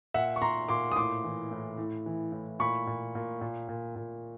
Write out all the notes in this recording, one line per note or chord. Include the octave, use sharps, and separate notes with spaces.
A#2 E5 F#5
C#6
A#2 A#5 C6
A#2 C6 D6
D#6
A2 C6 D6
E3
A2
A2
E3
A2
A#2 B5 C#6
A#2
A#2
A#2
A#2
A#2